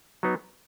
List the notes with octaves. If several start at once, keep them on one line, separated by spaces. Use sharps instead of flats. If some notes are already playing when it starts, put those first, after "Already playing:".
F#3 B3 D#4